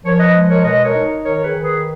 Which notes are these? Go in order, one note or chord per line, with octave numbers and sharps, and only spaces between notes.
F3 A#4 C#5
B4 D#5
G#3
A#4 C#5
B2 B4 D#5
A#4 C#5
D#4
D#3 A#4 C#5
G#4 B4
D#3
G#4 B4